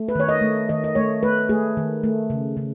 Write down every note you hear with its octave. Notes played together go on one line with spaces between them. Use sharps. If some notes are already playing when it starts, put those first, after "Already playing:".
Already playing: A3
B4
D#3 C#5
D#5
A3
D#3 D#5
D#5
A3 C#5
A3 B4
A3 G#4
D#3
A3
C#3
C#3